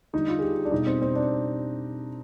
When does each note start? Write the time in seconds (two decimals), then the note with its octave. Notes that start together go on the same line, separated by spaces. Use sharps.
0.13 D3 G3 D#4
0.28 F4
0.39 G#4
0.42 G4
0.65 D4
0.72 B2 G3 D#4
0.87 C4
1.02 C4
1.15 D4